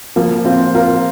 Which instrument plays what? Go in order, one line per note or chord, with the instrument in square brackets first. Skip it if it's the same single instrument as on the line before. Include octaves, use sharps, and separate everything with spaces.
[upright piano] F3 A#3
C4 F4
F4 A#4